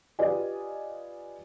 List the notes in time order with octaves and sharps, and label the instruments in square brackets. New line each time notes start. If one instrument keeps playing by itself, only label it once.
[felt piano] F4 G4 B4 D5 D#5 G#5